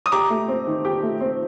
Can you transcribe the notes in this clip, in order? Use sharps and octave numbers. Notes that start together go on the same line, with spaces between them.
D#6
G4 A#5 D6
A3
C4
D#3
G4
A3
C4